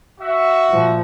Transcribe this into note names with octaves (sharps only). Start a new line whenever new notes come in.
F#4 E5
A#2 F3